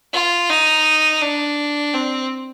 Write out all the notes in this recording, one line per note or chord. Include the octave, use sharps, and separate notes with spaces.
F4
D#4
D4
C4